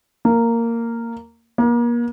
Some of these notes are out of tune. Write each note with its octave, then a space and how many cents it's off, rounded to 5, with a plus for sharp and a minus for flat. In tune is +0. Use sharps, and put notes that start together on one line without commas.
A#3 -10
A#3 +35